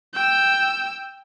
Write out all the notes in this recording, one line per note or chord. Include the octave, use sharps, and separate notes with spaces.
G5 E6